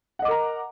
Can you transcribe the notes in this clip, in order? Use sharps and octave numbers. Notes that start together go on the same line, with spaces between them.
A#4 D#5 F#5 A#5 D6